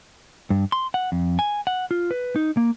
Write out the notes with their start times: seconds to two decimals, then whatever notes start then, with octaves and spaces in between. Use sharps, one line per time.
0.50 G2
0.72 C6
0.94 F#5
1.12 F2
1.39 G#5
1.67 F#5
1.91 F4
2.11 B4
2.36 D#4
2.57 A#3